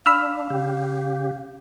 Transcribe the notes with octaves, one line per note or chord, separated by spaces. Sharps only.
D4 F5 B5 E6 F6
C#3 G4